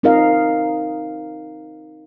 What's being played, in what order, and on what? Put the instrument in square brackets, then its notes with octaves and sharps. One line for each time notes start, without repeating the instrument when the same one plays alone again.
[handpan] C4 D#4 F4 A#4 D#5 F5